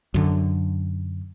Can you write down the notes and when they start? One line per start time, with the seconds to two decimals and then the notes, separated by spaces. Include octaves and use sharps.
0.14 F#2 D3